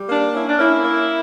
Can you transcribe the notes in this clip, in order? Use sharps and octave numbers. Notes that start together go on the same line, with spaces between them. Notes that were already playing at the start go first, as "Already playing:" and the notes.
Already playing: G3
A#3 D4
C#4 E4
D4
A#3 C#4 E4
A#3